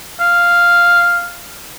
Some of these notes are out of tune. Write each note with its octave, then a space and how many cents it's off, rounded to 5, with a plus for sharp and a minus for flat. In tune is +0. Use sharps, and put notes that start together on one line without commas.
F5 +0